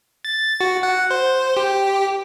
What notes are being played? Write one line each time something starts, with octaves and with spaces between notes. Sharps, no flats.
A6
F#4
F#5
C5
G4